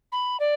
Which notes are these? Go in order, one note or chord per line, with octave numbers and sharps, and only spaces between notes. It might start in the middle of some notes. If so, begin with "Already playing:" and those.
B5
D5